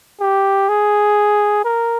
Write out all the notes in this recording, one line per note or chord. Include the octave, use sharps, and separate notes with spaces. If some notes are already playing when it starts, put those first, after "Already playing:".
G4
G#4
A#4